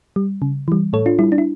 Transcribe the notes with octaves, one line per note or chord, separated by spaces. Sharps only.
G3
C#3
E3 G3
A2 A4 C#5
D4 F4
G3 E4
D4
E4